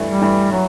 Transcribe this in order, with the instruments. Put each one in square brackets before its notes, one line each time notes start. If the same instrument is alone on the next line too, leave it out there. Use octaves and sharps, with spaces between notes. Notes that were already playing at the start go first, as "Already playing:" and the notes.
Already playing: [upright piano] G2 E3 A3
[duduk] G3
[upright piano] G2 E3 A3
[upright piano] E3 [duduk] F#3